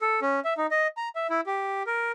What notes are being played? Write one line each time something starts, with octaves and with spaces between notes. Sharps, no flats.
A4
C#4
E5
D#4
D#5
A#5
E5
E4
G4
A#4